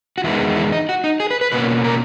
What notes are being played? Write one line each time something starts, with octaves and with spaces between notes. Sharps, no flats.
F#4
E2 D#3 G#3 B3 E4
E4
D#4
F#4
D#4
G#4
B4
B4
B2 A#3 C#4 B4
A#4